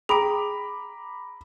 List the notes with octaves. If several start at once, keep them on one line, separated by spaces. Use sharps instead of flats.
G#4 G5 A#5 B5 D6